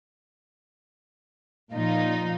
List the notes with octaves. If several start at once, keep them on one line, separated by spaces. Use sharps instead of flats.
A#2 F3 D#4 F4